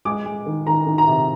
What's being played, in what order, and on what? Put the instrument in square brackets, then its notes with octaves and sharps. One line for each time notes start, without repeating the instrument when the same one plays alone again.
[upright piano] G#3 D6
G#3
D#3
D#3 A#5
D#3
A#5
C3